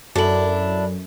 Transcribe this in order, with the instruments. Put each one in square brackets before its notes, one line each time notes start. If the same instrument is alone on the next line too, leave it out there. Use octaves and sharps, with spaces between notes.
[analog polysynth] F#2 [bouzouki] D4 E4 [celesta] F#4 A4 F#7